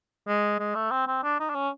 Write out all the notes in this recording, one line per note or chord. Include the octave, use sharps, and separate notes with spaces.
G#3
G#3
A3
C4
C4
D4
D#4
D4
C#4